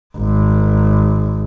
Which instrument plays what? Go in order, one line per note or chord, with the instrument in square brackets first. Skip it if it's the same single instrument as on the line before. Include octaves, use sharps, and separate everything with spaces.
[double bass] G#1